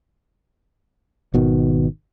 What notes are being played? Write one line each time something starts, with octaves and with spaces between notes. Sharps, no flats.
G#1 B2 D#3